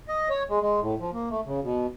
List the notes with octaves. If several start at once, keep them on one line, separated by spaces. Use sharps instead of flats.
D#5
C#5
G#3
G#3
A2
F3
A#3
A3
C#3
B2